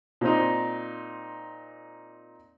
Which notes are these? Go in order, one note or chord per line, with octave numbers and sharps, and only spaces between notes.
A#2 C4 D#4